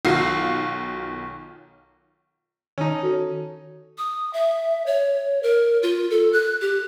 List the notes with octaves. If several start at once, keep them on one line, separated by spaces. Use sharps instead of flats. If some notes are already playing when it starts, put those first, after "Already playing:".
B1 D#3 F4 F#4 F5 C7
D#3 C#4 D#4 A5
F#4 A4 C#5
D#6
E5
C#5
A#4
F4
A4
F#6
G4